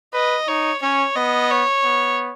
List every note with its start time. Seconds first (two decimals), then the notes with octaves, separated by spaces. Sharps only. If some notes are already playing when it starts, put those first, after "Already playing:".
0.13 B4 D#5
0.48 D#4 C#5
0.82 C#4 C#5
1.16 B3 D#5
1.50 C#5
1.84 B3